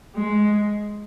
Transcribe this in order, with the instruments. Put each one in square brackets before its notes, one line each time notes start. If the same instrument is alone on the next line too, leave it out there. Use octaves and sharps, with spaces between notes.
[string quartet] G#3